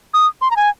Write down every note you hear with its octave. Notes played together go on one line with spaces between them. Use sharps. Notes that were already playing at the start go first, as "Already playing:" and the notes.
D#6
C6
A#5
G#5